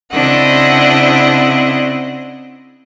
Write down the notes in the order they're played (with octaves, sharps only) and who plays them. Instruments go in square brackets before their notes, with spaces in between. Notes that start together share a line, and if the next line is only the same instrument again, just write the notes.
[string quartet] C#3 C4 D4 E4 D#5 F#5